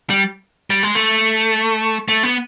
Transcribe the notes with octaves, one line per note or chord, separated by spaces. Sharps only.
G3
G3
G#3
A3
A3
B3